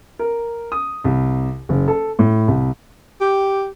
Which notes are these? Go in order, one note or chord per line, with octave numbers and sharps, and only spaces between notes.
A#4
D#6
C2
F#1
A4
A2
C2
G4